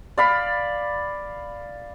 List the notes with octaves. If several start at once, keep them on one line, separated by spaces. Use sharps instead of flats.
D5 F5 B5